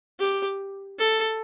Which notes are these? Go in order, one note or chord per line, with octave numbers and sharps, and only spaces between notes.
G4
A4